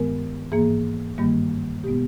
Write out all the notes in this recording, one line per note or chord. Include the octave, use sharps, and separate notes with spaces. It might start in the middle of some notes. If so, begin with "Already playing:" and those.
Already playing: G2 D#3 G#3 B3 A#4
G#2 E3 A#3 G#4
G2 D#3 G3 A#3
B2 G#3 B3 G4